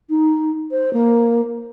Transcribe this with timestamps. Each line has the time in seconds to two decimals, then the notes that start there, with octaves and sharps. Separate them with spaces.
0.09 D#4
0.71 C5
0.93 A#3